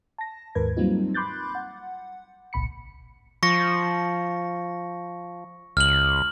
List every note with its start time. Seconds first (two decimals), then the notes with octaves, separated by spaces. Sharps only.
0.18 A5 A#6
0.55 D#2 G#2 D#3 A#4 B4 G#6
0.77 F#3 G3 A#3 C4 D#4 F4
1.14 B5 C6 D6 F#6 G6 A6
1.55 F#5
2.53 G#1 C#2 A#2 B5 C#7
3.43 F3 C#6 A#6 C#7
5.77 C#2 F6 F#7